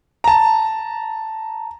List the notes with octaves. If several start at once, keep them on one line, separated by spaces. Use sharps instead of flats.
A5 A#5